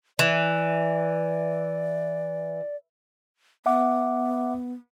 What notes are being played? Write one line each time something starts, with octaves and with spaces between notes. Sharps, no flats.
E3 D5
B3 E5 F#5 D6